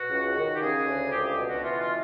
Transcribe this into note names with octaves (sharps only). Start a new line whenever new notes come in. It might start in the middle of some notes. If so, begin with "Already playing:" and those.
Already playing: B2 F#4
C#2
D#3
G4
C#3 G#4
D2
C#2 G4
G4
B2
F#4
E3 F4
F4